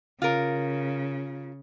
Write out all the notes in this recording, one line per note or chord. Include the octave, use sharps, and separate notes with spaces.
C#3 F4 A#4